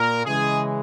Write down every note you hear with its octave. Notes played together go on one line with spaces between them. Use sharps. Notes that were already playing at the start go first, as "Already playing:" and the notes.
Already playing: A#2 A#4
C#3 E3 G#3 G#4